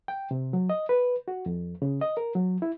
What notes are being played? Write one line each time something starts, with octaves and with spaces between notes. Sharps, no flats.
G5
C3
F#3
D#5
B4
F#4
F2
C#3
D#5
A#4
F#3
E4